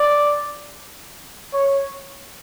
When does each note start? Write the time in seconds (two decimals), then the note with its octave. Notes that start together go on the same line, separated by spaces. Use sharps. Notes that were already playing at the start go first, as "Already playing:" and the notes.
Already playing: D5
1.53 C#5